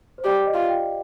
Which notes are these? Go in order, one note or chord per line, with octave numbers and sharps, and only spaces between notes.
C5
G4 D5
D#5
F4
G5